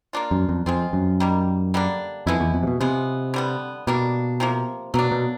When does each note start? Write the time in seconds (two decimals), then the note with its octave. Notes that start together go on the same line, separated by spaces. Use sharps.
0.13 A#3 D4 F4
0.31 F#2
0.49 F2
0.66 F2 G#3 C4 F4
0.93 F#2
1.20 D#3 G3 A#3
1.74 D3 G3 A#3 D4
2.26 F2 G#3 B3 E4
2.40 E2
2.54 F2
2.63 C3
2.67 B2
2.80 C3 F3 G#3 B3
3.34 D3 G3 B3
3.87 B2 G3 A#3 D4
4.40 C3 F3 A#3
4.94 B2 F#3 A#3 D4
5.11 B2